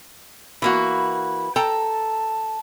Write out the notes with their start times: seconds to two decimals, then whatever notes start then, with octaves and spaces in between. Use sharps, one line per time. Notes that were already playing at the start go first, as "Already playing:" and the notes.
0.62 E3 A#3 F#4 B5
1.56 A4 G5 A5 A#5